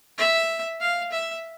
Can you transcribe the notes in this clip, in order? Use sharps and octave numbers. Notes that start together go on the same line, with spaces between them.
E5
F5
E5